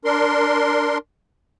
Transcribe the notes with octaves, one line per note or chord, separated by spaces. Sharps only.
D4 A#4 C6